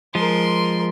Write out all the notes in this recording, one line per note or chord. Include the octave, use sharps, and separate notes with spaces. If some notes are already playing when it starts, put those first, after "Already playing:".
F3 G#3 A#4 C6